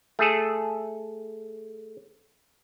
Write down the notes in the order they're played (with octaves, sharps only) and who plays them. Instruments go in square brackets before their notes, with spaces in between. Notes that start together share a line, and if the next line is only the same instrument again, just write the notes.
[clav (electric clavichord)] A3 G#4 A4